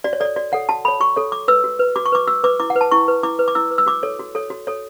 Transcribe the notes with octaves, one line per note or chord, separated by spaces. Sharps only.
F#4 D5
C#5
A4 C#5 D5
F#4 D5
A4 C#5 F#5
F#4 A5
A4 C#5 B5
F#4 C#6
A4 C#5
F#4 D6
B4 E6
F#4
B4
F#4 D6
C#6
B4 D6
F#4 E6
B4 D6
E4 D6
F#5
B4
A5
E4 C#6
B4
E4 D6
B4
D6
E4 E6
B4
E6
F#4 D6
A4 C#5
F#4
A4 C#5
F#4
A4 C#5